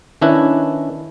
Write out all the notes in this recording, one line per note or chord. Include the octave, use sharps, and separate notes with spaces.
D#3 C#4 D4 E4 B4